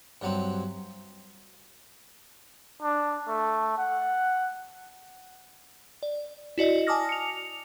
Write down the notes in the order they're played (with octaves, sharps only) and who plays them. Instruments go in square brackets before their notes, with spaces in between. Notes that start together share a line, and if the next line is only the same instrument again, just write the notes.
[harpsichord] G2 F#3 C4
[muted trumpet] D4
A3
F#5
[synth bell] D5
E4 F#4 D5 D#5
G#5 A5 D6 D#6 F6 A#6
C#7 F7